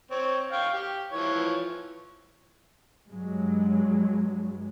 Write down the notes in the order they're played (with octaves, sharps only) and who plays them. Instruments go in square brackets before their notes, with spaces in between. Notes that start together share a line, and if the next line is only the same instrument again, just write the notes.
[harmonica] C4 C#5
F5 G5 C#6
G4
E3 F3 C#5
[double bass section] G2 F#3 G#3